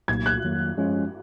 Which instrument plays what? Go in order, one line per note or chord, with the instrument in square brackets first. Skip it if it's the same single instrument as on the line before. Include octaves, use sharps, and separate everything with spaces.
[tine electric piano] C2 A#2 F#3 A#3 D#4 [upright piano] G#6
[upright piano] F#6
[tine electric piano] F2 D#3 F#3 A#3
F#2 F3 G#3 C#4 F4